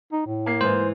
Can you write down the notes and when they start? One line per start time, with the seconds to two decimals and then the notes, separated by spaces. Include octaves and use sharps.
0.13 D#4
0.26 A2
0.46 A#3 C7
0.61 G#2 E3 C5